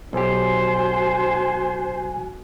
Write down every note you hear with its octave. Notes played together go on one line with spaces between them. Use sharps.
B1 F#4 G4 C5 G#5